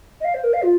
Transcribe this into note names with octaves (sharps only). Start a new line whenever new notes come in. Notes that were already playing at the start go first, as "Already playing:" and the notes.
D#5
F5
C5
A#4
F5
F4